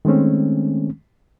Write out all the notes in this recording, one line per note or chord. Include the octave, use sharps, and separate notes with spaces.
D#3 G#3 A3 C4 C#4